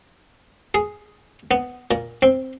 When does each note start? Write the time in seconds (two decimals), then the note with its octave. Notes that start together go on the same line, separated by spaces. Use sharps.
0.74 G#4
1.51 B3
1.91 A#2
2.22 C4